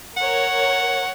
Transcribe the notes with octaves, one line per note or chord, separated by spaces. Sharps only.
A#4 C#5 F#5